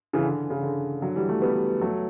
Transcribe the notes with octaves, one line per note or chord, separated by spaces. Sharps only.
C#3 E3
D3
C#3
D3
D3 F#3
E3 G3
F#3 A3
G3 B3
F#3 A3